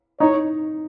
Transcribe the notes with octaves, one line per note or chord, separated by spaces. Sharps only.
D#4 C#5